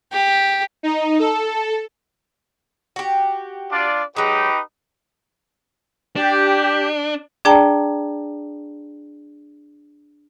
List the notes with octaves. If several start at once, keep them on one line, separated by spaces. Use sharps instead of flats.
G4
D#4
A4
F#4 G4
D4 F4 D5
F#3 G#3 D#4 G4 B4
D4 G4
D4 G#4 D5 G5 A5 A#5